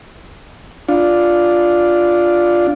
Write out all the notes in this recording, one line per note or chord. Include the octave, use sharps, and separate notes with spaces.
D4 F4